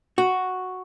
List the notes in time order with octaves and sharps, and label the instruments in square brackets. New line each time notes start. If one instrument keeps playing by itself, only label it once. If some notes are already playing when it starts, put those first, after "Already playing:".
[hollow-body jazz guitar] F#4